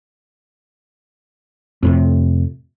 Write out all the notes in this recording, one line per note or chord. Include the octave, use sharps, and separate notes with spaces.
F2 A2 C3